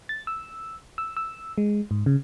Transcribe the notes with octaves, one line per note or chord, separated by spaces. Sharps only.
A6
E6
E6
E6
G#3
G#2
C#3